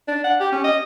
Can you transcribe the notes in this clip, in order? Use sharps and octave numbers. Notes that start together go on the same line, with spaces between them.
D4
F#5
G4
C#4
D#5